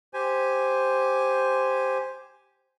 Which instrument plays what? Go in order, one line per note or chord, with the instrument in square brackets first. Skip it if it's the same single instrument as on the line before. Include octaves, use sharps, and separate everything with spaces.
[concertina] G4 C5 G#5